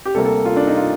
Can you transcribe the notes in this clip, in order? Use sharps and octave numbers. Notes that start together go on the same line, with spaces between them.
G4
D2 C3 G3 A#3 A4
A4
F4
D4
D#4
F4